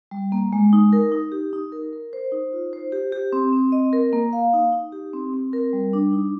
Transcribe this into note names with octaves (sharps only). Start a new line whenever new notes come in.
G3
A#3
G#3
D#4
A#4
D#4
G4
D#4
A#4
A#4
C5
D#4
F4
C5
G4
G4
C4
C4
D#5
A#4
A#3
F5
D#4
D#4
G4
C4
C4
A#4
G3
D4
D#4